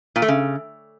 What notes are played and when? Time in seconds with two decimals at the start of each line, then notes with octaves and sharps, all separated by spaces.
0.16 A#2
0.22 A3
0.28 C#3